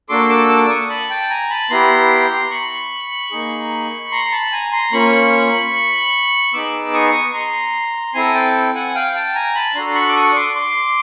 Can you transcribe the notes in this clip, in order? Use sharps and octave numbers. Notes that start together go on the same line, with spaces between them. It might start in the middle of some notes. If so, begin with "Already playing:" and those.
A#3 D4 F#4 A4 C6 D6
D6 E6
D6 E6
C#6 D#6
A5 B5
G5 A5
G#5 A#5
A5 B5
B3 E4 G4 A#5 C6
B5 C#6
A#3 D#4 G#4
A#5 C6
A5 B5
G#5 A#5
A#5 C6
A#3 C#4 F4 B5 C#6
B3 D#4 G#4 D6 E6
C#6 D#6
A#5 C6
C4 E4 A4 G#5 A#5
G5 A5
F#5 G#5
F5 G5
G5 A5
G#5 A#5
A5 B5
D4 F#4 A4 A#5 C6
B5 C#6
D6
C#6 D#6
C6 D6
C6 D6